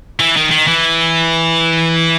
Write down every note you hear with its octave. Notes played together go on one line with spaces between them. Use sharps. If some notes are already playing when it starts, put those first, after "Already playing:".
E3
D#3
D#3
E3